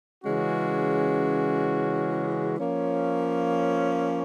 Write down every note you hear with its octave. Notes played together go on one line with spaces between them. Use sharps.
C#3 E3 G#3 C#4 F#4
F3 A#3 C#4